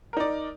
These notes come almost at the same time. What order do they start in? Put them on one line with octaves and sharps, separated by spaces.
A#4 D#4 D5